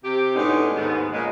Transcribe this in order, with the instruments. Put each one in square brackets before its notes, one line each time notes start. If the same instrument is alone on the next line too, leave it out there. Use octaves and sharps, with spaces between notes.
[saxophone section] C3 G4
A2 D3 G#3 B3 C#4 D#4
D#2 G#2 B3
A#2 C#3 G#3